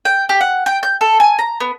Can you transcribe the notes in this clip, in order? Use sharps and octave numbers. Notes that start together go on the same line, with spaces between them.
G5
G4
F#5
G5
G6
A4
G#5
A#5
B3